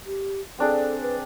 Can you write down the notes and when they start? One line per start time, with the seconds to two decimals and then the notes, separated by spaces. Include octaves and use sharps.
0.06 G4
0.58 C4 D4 G#4 A4
1.02 B4